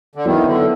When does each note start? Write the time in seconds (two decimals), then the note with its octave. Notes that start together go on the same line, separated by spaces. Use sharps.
0.16 D3
0.26 D#3 F#3 B3 E4
0.45 D3